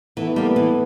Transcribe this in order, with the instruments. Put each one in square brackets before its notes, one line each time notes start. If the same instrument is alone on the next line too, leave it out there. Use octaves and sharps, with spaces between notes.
[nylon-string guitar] E3 [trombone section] A3 B3
[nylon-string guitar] G3 A#3
E3